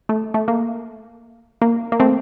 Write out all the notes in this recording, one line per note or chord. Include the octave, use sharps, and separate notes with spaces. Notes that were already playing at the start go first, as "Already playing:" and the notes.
A3
A3
A#3
A#3
A#3
A3 C4